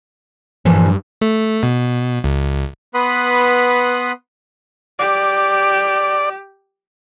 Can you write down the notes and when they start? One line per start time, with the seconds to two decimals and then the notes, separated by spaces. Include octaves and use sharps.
0.65 G2 A#2 E3 F3
1.21 A3
1.63 B2
2.24 C#2
2.94 B3 B4 F#5 B5 C6 D#6
4.99 G4 D5